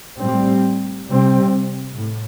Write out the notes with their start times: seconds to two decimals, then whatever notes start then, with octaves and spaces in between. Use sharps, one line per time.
0.19 A2 G3 C4
1.08 C3 G3 C4
1.97 A2